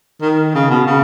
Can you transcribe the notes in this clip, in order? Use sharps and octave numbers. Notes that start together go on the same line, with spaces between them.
D#3
C#3
B2
C#3